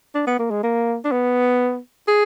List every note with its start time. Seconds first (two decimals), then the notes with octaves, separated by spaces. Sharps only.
0.15 D4
0.27 B3
0.39 A#3
0.50 G#3
0.63 A#3
1.04 D4
1.11 B3
2.07 G#4